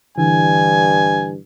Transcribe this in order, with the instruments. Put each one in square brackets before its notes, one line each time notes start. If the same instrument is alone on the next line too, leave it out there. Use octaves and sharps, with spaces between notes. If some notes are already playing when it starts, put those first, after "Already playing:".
[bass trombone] G2 [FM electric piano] D3 E3 [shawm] G#5